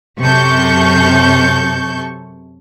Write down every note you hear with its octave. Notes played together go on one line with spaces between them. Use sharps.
F#2 C3 A4 C#6 G6